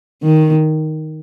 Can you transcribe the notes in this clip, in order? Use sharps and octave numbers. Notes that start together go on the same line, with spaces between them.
D#3